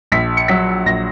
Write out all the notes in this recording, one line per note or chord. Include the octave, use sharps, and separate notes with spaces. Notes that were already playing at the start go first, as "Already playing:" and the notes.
A#1 B6
C#7
F#3 B6
A#1 A#6